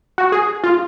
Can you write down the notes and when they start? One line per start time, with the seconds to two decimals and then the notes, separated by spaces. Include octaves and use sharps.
0.18 F#4
0.32 G#4
0.64 F4